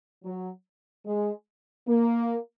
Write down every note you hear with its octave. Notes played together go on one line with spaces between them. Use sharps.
F#3
G#3
A#3